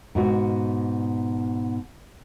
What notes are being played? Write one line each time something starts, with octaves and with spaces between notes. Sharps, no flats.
G#2 B2 F#4